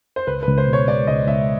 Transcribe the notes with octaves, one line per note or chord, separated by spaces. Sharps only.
C5
C#2 B4
B4
C#2
C5
B2
C#5
G#3 D5
C#2 D#5
C#2 E5